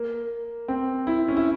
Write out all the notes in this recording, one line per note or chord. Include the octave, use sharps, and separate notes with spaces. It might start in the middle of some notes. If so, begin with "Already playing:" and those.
Already playing: A#3
C4
E4
C#4
E4